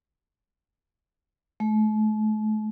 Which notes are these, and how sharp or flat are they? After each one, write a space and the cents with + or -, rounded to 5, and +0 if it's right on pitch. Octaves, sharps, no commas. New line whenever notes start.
A3 -40